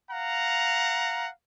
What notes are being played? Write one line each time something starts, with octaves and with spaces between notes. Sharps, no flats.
F5 F#5 A#5